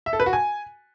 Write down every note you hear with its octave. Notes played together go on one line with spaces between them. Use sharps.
E5
A4
B4
F#4
G#5